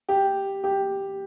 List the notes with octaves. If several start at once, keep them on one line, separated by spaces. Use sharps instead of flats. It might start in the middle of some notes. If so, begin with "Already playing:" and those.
G4
G4